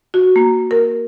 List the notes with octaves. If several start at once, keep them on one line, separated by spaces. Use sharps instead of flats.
F#4
A#3
A#4